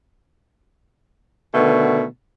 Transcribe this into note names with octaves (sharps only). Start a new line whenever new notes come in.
B2 D3 D#3 A3 B3